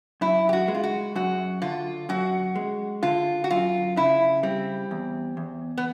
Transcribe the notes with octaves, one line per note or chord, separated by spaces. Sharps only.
F#2 E4
G4
F#4
G#3
F4
F#4
F#2 F#4
D3 F4
F#2 F#4
G#3
D3 F4
F#4
F#2 F4
C#3 E4
G3 C4
E2
E2
B3